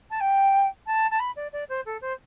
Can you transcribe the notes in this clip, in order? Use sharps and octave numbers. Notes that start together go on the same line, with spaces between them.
A5
G5
A5
A5
B5
D5
D5
C5
A4
C5